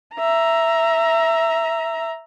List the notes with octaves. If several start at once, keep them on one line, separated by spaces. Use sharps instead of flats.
E5 A#5